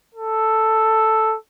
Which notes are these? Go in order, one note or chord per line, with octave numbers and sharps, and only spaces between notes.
A4